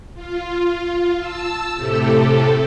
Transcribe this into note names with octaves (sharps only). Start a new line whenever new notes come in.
F4
A5 E6
A2 C3 A3 G4 A4